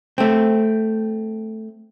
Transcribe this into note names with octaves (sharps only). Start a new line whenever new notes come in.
A3 C4